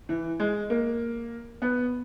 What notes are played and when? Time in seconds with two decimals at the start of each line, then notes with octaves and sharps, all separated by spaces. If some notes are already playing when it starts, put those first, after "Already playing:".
0.09 E3
0.40 G#3
0.70 A#3
1.62 B3